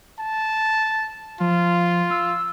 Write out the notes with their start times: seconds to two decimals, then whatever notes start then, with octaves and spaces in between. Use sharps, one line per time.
0.19 A5
1.40 F3 F4
2.10 E6